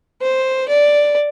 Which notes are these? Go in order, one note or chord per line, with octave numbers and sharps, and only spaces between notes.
C5
D5